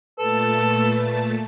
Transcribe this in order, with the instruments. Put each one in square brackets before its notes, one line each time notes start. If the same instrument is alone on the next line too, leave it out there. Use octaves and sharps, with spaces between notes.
[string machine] A#2 A3 A5 [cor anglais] A4 [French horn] B4